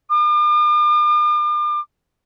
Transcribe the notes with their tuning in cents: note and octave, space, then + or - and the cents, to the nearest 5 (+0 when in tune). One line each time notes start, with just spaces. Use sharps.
D6 +45